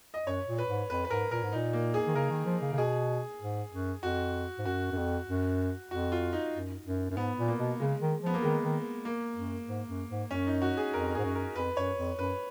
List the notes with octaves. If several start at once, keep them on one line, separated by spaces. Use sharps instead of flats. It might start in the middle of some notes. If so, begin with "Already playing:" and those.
D#5
F#2 C#5
A#2
B4
G#2
F2 B4
B4
G#2 A#4
A#2 A#4
G#2
A#2 D#4
A#3
G#4
D#3
C#3 A#4
D#3
F3
C#3
C#3
B2 G#4
G#2
F#2
F2 F#4
G#2
F#2 F#4
F#2
F2
F#2
F2 F#4
F4
D#4
F#2
F#2
F#2
G#2 B3
A#2
A#3
B2
C#3 G#3
D#3
F3 B3
A#3
D#3 G#3
D#3
A#3
F#2
G#2
F#2
G#2
F#2 C#4
D#4
F#4
G#4
F2 A#4
G#2 G#4
F#2
A#4
F2 B4
F#2 C#5
F2
F#2 B4